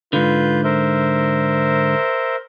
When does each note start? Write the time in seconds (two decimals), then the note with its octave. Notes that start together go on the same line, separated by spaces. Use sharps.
0.13 G#2 D3 F4 B4 G6
0.64 A#4 C5 E5